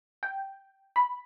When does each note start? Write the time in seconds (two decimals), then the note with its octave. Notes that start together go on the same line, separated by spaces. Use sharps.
0.23 G5
0.96 B5